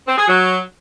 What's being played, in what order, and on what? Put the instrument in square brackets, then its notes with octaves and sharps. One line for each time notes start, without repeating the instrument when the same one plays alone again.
[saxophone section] C4
G#4
F#3